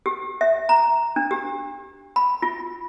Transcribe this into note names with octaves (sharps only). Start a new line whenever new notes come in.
G4
E5
A#5
D4
G4
B5
F4